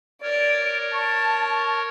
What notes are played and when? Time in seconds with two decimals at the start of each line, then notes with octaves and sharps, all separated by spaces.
0.22 A#4 C#5 D5
0.94 A5 C#6